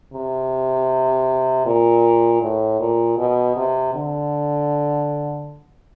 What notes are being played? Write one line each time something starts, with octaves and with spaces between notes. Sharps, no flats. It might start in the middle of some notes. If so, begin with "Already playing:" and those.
C3
A#2
A2
A#2
B2
C3
D3